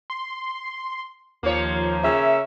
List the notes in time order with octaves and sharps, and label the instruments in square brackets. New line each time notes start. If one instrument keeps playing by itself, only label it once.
[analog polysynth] C6
[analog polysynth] D#2 F3 [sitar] A#3 C#5
[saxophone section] C#3 C#4 E5